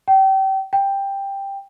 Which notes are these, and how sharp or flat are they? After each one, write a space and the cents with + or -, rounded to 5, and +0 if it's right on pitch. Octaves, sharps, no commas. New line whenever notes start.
G5 -30
G5 +10